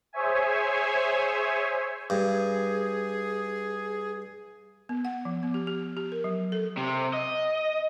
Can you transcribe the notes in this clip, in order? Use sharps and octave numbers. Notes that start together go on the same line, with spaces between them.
G#4 C5 C#5 E5 G#5
G2 G#4
B3
F#5
F3
B3
G4
G4
G4
A#4
F#3
A4
C3
D#5